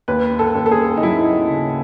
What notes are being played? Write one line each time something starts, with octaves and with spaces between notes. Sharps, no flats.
D#2 B4
A4
D#2
A4
G#4
D#4
F#3 E4
C#3